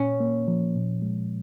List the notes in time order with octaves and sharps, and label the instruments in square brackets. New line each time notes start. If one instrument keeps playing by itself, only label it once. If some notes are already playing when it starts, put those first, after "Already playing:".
Already playing: [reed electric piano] A#2 [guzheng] C#4
[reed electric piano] A#3
F3
A#2
G#3